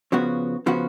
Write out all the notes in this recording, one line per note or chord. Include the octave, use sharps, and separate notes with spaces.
C#3 F3 B3 F#4
C#3 F3 B3 F#4